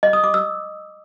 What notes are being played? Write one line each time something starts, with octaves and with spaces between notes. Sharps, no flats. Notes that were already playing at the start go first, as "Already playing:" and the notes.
D#5
D#6
D6
E6